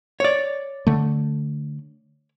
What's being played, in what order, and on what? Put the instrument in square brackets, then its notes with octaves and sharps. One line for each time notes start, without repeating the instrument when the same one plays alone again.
[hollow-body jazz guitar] C#5 D5
[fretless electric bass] D3 A3